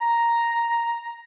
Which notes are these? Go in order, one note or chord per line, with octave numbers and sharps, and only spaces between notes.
A#5